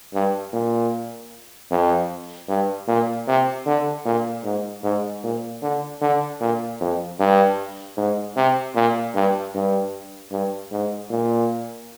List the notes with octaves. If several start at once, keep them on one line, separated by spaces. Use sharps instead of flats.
G2
A#2
F2
G2
A#2
C3
D3
A#2
G#2
G#2
A#2
D3
D3
A#2
F2
G2
G#2
C3
A#2
G2
G2
G2
G#2
A#2